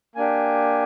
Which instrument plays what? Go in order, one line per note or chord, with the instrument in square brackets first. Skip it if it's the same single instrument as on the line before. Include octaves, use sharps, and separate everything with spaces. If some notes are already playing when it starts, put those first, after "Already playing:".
[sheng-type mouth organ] A#3 D4 G4 G#5